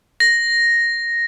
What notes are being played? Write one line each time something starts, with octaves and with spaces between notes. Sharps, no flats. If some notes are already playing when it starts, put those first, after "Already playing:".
A#6